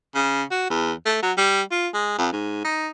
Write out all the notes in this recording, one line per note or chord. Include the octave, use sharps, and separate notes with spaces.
C#3
F#4
E2
A3
F#3
G3
F4
G#3
F2
G#2
D#4